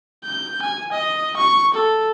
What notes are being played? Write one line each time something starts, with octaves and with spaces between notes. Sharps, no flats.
G6
G#5
D#5
C#6
A4